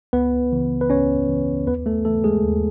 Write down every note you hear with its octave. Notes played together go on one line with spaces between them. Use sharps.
C#2 B3 B4
C#3 E3
B4
C#2 C#4 C#5
C#3 E3
D#2 B3 B4
A3 A4
C#3 E3 A3 A4
G#3 G#4
D#2